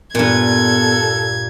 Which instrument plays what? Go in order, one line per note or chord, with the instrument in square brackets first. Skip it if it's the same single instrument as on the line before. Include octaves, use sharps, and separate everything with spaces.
[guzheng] G2 A#2 [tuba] B3 [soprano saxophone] A4 [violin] G#6